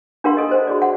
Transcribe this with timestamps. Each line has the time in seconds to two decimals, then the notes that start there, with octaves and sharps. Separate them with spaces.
0.24 D4 G4 A#4 F5 F#5 C6
0.37 G4 A4 D#5
0.51 C5
0.67 F#4 G#4 D5
0.82 F#5